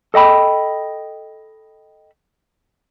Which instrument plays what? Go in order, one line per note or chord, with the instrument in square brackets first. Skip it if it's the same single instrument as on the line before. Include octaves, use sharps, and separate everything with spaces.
[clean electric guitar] A4 D#5 G5 B5